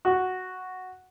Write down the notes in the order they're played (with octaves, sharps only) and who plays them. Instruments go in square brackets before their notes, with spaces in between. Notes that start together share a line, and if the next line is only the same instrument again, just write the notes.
[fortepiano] F#4